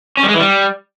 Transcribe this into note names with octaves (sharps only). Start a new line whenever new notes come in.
C#4
G3
G#3
E3
G3